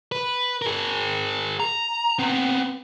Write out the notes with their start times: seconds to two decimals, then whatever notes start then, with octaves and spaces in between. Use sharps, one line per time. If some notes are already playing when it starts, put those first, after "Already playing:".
0.12 B4
0.62 G#4 A#4
1.60 A#5
2.19 B3 C4